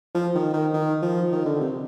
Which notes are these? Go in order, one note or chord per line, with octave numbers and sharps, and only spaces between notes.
F3
D#3
D#3
D#3
F3
D#3
D3
C3